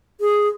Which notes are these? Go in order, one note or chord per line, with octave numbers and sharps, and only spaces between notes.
G#4